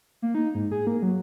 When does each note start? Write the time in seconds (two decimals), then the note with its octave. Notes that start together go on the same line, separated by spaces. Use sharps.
0.22 A#3
0.35 D#4
0.55 G#2
0.71 G#4
0.87 A#3
1.02 F#3